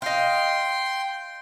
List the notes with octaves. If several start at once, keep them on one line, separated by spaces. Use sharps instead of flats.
D#5 F5 G5 C6